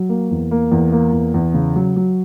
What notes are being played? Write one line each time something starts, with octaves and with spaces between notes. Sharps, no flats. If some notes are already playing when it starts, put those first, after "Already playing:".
Already playing: F#3
A#3
E2
A#3
E2
A#3
E2
E2
C#3
F#3
F#3